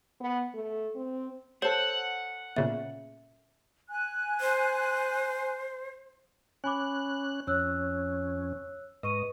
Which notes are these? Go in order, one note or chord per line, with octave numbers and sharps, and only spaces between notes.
B3
A3
C4
A4 C5 C#5 F#5
A#2 C#3 B3 E5
G#5 F#6
C5
C#4 G#5 B5 D6 F#6
F2 C#4 C#5 E6 F#6
G#2 B4 D#5 C#6 D#7